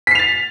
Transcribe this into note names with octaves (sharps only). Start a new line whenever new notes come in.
A6 B6 C7 F7